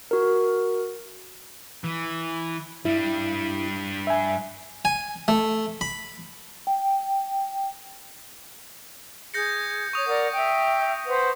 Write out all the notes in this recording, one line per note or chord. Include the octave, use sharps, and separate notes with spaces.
F#4 A#4
E3
G2 G3 E4
E5 G#5
G#5
A3
B5
G5
G#4 G6 A#6 C#7
C#5 C#6 D#6
A#4 D5 F#5
E5 G5
B4 C5 F#5